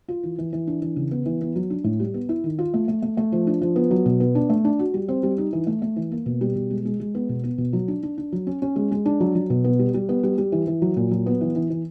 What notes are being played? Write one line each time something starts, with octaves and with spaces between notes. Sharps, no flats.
F4
E3
E3
E3
D4
E3
C#3
B3
E3
B3
F#3
D4
A2
G3
B3
E4
D#3
F4
A3
A3
A3
A3
F3
D4
F3
B3
F#3
B2
B3
D4
A3
D4
F#4
G3
C4
G3
D#4
E3
A3
A3
E3
A#3
B2
G3
B2
G#3
G#3
G#3
B3
B2
B3
B2
F#3
D4
D4
D4
F#3
C#4
C#4
G#3
G#3
D4
F#3
F#3
B2
B3
G3
G3
B3
G3
G3
E3
E3
F#3
A#2
F#3
B3
E3
E3
E3